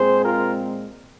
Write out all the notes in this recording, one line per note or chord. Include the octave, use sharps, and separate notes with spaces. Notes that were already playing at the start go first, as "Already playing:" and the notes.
Already playing: A#2 G#3 C4 G#4 C5
F4 A#4